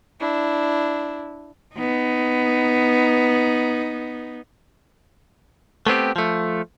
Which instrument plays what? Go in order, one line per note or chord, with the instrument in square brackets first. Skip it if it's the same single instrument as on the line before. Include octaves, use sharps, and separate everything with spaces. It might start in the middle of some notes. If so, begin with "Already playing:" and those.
[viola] D4 E4
[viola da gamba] B3 D#4
[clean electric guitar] A3 B3 C4 G4
F3 A3